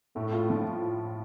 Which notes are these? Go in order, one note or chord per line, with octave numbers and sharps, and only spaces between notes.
A2 A3
F4
F3